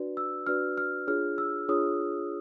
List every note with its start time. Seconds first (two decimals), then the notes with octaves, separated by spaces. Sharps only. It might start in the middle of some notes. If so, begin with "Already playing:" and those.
Already playing: D4 F#4 B4 D5
0.17 E6
0.46 D4 F#4 B4 D5 F6
0.78 F6
1.07 D4 F4 G#4 C#5 F6
1.38 E6
1.68 D4 F4 G#4 C#5 D#6